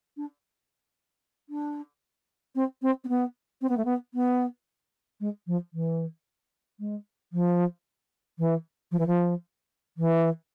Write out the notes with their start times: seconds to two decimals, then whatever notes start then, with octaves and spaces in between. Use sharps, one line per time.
0.17 D4
1.49 D4
2.55 C4
2.82 C4
3.04 C4
3.08 B3
3.61 C4
3.69 B3
3.77 A3
3.85 B3
4.14 B3
5.20 G#3
5.47 F3
5.73 E3
6.79 G#3
7.32 F3
8.38 E3
8.91 F3
8.99 E3
9.06 F3
9.97 E3